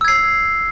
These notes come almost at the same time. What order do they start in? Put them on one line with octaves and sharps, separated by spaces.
E6 G#6 C7